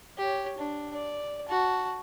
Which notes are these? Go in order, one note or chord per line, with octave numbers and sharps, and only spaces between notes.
G4 C#5
D4
D5
F#4 A5